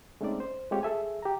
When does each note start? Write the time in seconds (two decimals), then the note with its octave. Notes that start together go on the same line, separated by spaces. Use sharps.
0.21 G#3 A3 C4 C#4 D#4 D5
0.40 C5
0.71 G#3 A3 C4 F4 G4 C#5
0.83 G#4 A4 E5 G#5
1.23 G4 A#5